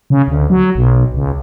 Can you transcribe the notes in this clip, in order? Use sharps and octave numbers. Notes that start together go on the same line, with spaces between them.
C#3
D2
F#3
B1
C#2